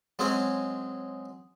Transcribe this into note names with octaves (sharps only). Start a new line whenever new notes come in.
F#3 G#3 C4 C#4 G#5